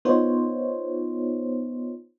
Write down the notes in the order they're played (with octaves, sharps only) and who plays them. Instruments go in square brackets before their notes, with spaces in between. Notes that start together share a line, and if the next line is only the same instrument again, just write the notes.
[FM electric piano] B3 D#4 F4 C5 C#5